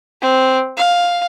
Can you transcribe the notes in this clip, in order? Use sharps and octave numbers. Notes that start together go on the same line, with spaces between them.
C4
F5